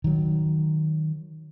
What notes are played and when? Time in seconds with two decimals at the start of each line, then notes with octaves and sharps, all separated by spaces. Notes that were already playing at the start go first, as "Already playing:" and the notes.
0.04 D#3 F#3